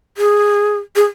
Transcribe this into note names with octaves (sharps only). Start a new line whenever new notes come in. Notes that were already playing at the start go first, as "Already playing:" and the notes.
G#4
G#4